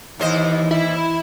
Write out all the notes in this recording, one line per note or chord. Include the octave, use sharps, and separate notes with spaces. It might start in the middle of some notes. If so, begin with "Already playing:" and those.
D#2 E3 C5 D#5
E4